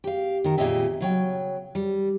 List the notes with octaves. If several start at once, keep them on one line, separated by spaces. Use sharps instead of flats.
G4 F5
D#3 A#4
F2 A#2 G#3 G4 D#5 E5
C#3 F#3 G5
G3